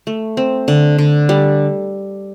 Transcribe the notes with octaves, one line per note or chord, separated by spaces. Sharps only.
A3
C4
D3
D3
G3